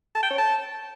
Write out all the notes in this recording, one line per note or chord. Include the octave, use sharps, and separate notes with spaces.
A5
G5
C#5
A5